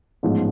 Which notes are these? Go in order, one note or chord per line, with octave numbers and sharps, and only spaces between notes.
A1 G#2 F3 B3